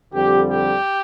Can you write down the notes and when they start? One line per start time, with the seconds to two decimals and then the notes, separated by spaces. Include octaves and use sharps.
0.12 F2 D3 G3 G4
0.51 G4